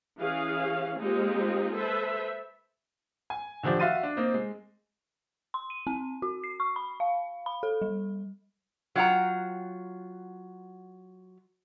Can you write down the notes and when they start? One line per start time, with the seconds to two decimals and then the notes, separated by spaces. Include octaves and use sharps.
0.19 E3 C#4 G#4 F5
0.98 G#3 A#3 C4 D#4 F4 G4
1.74 A4 B4 C5 E5
3.30 G#5
3.63 D3 D#3 F3 G4 D5
3.80 F#4 E5 F5 C6 A6 D#7
4.03 D4
4.17 A#3 C4 D#4
4.34 G#3
5.54 C6
5.70 D#7
5.87 C4
6.22 F#4
6.44 C7
6.60 C#6
6.76 B5
7.00 F5
7.46 B5
7.63 A4
7.82 G3
8.95 F#3 F4 F#5 G5 A#5